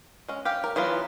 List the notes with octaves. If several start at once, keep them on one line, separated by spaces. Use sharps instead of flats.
G#3 C#4
G4 F5 G5
A#4
E3 F#3 B3 F4